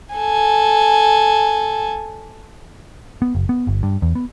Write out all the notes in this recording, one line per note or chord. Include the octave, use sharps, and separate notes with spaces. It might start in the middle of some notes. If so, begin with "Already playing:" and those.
A4 G#5
B3
F#1
B3
G1
G2
E2
B3